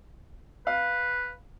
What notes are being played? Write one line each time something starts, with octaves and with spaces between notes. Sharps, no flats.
B4 F5